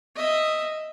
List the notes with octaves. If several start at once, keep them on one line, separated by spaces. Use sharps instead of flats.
D#5 E5